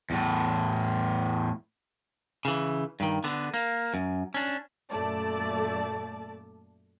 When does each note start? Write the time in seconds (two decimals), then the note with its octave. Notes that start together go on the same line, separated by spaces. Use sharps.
0.10 E2 A2
2.45 C#3 E3
3.00 G2 D#3
3.24 D3 B3
3.54 A#3
3.94 F#2
4.34 C#4 D4
4.90 F#2 A#2 A3 D5 A5